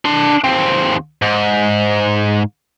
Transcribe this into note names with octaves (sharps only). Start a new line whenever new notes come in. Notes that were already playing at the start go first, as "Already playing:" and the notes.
D4 C6
D#2 C4
G#2